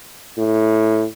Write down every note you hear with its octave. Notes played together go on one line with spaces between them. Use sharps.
A2